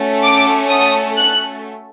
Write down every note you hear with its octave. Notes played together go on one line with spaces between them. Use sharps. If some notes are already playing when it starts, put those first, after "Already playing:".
Already playing: A3 C#4 F#4 A4
D6
D#6
F#6